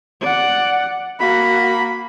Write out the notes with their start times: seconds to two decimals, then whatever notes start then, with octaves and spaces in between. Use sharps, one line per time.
0.22 D5 F#5
1.20 A#3 F#4 B5